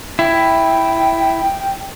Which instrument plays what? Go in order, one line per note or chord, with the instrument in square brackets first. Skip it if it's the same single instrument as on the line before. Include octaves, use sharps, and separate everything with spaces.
[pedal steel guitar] E4 [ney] G5